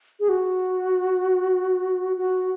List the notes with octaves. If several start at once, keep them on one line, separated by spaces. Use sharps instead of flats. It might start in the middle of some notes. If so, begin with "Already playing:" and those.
G#4
F#4
F#4